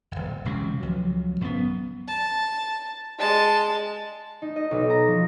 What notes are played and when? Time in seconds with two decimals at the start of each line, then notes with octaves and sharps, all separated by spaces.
0.11 D1 G1
0.45 E1 C#2 C3
0.80 C#2 F3 F#3
1.40 G#1 F#2 E3 B3
2.08 A5
3.19 G#3 A5
4.42 D#4
4.56 D#5
4.71 B1
4.90 A#5
5.07 F3